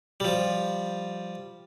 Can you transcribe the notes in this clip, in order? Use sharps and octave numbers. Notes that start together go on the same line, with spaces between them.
F3 G3